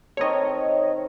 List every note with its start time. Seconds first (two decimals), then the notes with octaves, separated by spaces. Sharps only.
0.17 D#3 C4 A4 C#5 D#5